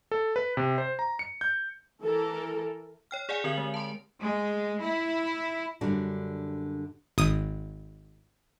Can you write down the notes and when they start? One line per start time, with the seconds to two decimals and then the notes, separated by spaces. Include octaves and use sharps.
0.11 A4
0.36 B4
0.57 C3
0.78 C5
0.99 A#5
1.19 C#7
1.41 G6
2.01 E3 A4 A#4
3.11 C#5 G5 F6
3.29 G#4 D5 F5 F#5 G#5
3.44 D3 C4 A#4 F#7
3.58 G#3
3.74 A5 C6
4.21 G#3
4.81 E4
5.81 F#2 D3 G3 D4 F#4
7.18 G#1 D#6